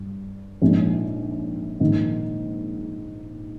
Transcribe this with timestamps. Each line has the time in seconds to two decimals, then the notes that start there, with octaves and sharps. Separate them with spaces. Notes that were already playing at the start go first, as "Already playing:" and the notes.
Already playing: G2
0.62 A#1 G#2 F3 G#3
1.80 A#1 G#2 D#3